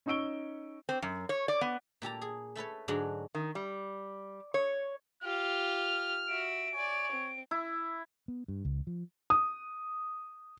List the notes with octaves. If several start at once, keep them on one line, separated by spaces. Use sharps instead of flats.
C#4 D#4 C#6 E6 D7 G7
C4
F#2
C#5
D5
B3
A#2 G4 A4 A#5
G#4
A3 A4 B4 C#5
G#2 D3 F#3 G#3 D4 F#4
D#3
G3
C#5
F4 G4 F6
F7
F#4 E5 D7
C#5 D5 G#5
C4
E4
B3
G2
C#2
F3
D#6